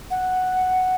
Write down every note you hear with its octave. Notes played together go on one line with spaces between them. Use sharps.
F#5